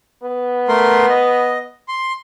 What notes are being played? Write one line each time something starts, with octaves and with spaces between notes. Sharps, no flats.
B3
A3 A#4 C6
D#5
C6